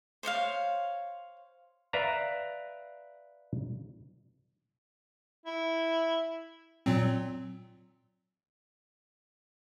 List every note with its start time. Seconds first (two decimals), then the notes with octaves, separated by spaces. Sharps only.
0.23 C5 C#5 D#5 F5
1.93 B4 D5 E5 F5 A#5
5.46 E4
6.86 A#2 F#3 C4